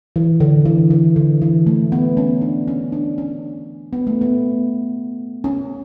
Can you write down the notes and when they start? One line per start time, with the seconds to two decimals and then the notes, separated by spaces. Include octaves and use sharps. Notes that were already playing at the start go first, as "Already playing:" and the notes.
0.16 E3
0.40 D3
0.65 E3
0.90 E3
1.16 D3
1.42 E3
1.67 A3
1.92 B3
2.17 C#4
2.41 D4
2.68 C#4
2.92 D4
3.18 C#4
3.93 B3
4.07 A3
4.21 B3
5.44 C#4